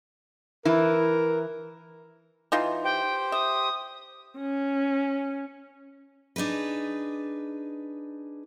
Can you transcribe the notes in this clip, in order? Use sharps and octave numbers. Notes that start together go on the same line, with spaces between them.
E3 E4 A#4
E3 D#4 F4
G4 C5 G5
E5 D#6
C#4
D4 D#4 G#4 B4